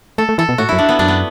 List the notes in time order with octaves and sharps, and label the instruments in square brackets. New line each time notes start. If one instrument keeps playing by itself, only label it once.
[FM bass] A3 [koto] A4
[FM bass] A3
[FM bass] E3 [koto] A4
[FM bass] B2
[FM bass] A2 [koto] F#4
[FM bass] F#2 [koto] E4
[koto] D4
B3
[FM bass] F#2 [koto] D4
[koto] B3